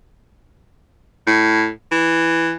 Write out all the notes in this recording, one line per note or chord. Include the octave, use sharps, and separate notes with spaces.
A2
E3